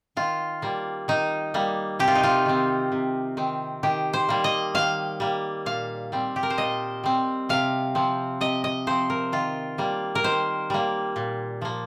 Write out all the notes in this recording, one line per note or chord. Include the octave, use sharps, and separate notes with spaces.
D#3 F4
G3 A#3
D#3 D#4
G3 A#3
C3 G4
F4
D#4
F4
D#3 C4
C3
D#3 C4
D#3 G4
C5
G3 A#3
D#5
D#3 F5
G3 A#3
A#2 F5
G3 C4
G4
A#4
C5
A#2 D#5
G3 C4
C3 F5
F3 C4
C3 D#5
D#5
F3 C4 C5
A#4
D#3 F4
G3 A#3
A#4
D#3 C5
G3 A#3
A#2
F3 A#3